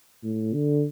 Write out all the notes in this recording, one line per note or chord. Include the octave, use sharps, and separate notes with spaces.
A2
D3